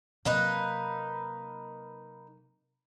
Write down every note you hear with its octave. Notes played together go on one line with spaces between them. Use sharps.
C3 F#3 A#3 D#4 B4